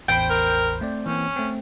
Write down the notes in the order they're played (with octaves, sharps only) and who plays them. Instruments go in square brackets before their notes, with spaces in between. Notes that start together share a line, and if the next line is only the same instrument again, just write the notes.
[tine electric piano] A1 E2 B5 [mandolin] C5 G5
[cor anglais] A#4
[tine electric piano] A3 C4 D5
[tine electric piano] E3 A#3 C4 [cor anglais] C#4
[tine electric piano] A3 C4